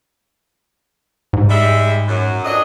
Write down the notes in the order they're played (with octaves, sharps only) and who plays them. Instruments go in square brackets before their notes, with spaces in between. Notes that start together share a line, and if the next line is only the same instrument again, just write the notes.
[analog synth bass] G#2
[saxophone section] G3 G#3 E5
F#2
F2 D4 D#5